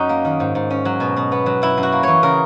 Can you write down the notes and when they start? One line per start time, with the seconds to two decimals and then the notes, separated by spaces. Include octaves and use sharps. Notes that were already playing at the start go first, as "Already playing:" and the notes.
Already playing: F#2 C#4 D#4 F#4
0.09 A#3
0.25 D#3
0.40 G#2
0.55 G#2
0.70 C#4
0.85 F#3
1.00 B2
1.17 B2
1.32 B3
1.46 F#3
1.62 F#2 E4
1.77 F#2
1.83 F#4
1.92 A#3
2.03 E3 C#5
2.23 C#3 A#4